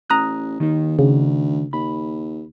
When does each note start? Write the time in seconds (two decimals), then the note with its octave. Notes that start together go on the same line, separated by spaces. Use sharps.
0.10 A1 A#5 D#6 F#6
0.60 D#2 D#3 D#4
0.99 D2 C#3
1.73 D#2 B5